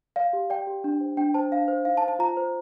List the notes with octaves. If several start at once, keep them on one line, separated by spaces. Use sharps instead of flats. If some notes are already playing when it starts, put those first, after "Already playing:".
D5 F5
G4
D5 G5
G4
D4
C5
D4 G5
C5 A5
D4 F5
C5
D#4 F5
A5
C5
A5
F4 A#5
C5